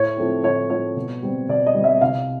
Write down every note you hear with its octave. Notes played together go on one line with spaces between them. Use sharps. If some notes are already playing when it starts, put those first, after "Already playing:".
Already playing: A2 C#5
F3 A3 C4
A2 C#5
F3 A3 C4 C#5
B2
G3 C4
B2 D5
D#5
G3 C4
E5
C2 F5